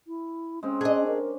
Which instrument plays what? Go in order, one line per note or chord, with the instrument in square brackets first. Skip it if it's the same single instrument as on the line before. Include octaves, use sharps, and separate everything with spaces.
[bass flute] E4
[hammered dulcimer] G#3 C4 [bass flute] C#4
[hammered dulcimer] D4 [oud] G#4 D#5
[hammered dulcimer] C#4 [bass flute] A#4